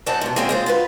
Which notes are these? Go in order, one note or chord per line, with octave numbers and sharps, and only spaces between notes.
F#2 C4 D#5 F#5 A5
G#2 B2
G#3 A#3 C4 C#4 F#4
G#3 C4 F4
F4 F#4 A#4 B4